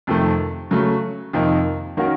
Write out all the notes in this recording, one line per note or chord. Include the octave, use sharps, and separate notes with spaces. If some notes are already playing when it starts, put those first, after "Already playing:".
F2 C3 D#3 A3
C#3 F#3 A3
F2 C3 D#3 A#3 D#4
D#3 A#3 C#4 F#4 A#4